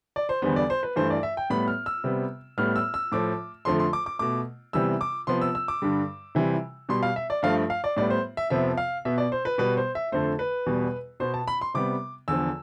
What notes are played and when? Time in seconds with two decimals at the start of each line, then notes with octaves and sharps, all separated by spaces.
0.16 D5
0.29 C5
0.42 E2 D3 G3 B3 C5
0.56 D5
0.70 C5
0.83 B4
0.96 G2 E3 A3 C5
1.10 D5
1.23 E5
1.37 G5
1.50 A2 G3 B3 B5
1.68 F6
1.86 E6
2.04 C3 G3 B3
2.58 A2 G3 B3 F6
2.76 E6
2.94 E6
3.12 A2 F3 A3 D6
3.65 F2 D3 F3 A3 C6
3.79 C6
3.93 D6
4.06 D6
4.19 B2 A3 D6
4.73 C3 E3 G3 B3 E6
5.01 D6
5.27 C3 F3 B3 C6
5.42 E6
5.55 E6
5.68 D6
5.82 G2 D3 G3
6.35 C3 E3 G3
6.89 B2 G3 B3 C6
7.03 F5
7.16 E5
7.30 D5
7.43 G2 F3 A3 F5
7.70 F5
7.84 D5
7.97 A2 G3 B3 D5
8.10 C5
8.37 E5
8.50 F2 C3 F3 B3 E5
8.77 F5
9.05 B2 B3 E5
9.18 D5
9.32 C5
9.45 B4
9.58 B2 G3 B3 B4
9.77 C5
9.95 E5
10.12 F2 D3 A3 C5
10.39 B4
10.66 E2 B2 G3
11.20 B2 B3 C5
11.34 A5
11.48 B5
11.61 C6
11.74 C3 G3 B3 D6
12.28 E2 D3 F3 E6